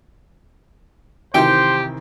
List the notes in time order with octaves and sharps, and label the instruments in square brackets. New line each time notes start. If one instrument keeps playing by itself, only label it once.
[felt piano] C3 D#3 E3 [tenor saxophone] G4 [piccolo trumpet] C5 [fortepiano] G5